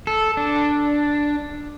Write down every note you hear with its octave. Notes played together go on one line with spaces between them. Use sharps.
A4
D4